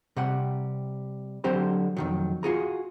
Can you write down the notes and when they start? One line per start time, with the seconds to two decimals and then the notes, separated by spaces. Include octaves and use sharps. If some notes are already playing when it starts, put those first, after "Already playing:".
0.17 C3 G3 F#5
1.44 D3 F#3 C4 G4 C5 A#5
1.97 F2 D#3 F#3
2.43 F4 F#4 G#4 A#5